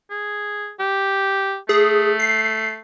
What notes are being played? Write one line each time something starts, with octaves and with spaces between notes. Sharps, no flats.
G#4
G4
A3 G#4
C7